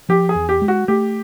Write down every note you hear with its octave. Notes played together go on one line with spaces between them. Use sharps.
F3 G4
G#4
E2
G4
G#3
F#4
A3 G4